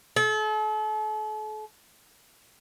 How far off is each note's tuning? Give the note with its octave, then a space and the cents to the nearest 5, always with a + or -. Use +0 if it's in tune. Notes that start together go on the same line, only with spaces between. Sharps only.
A4 -40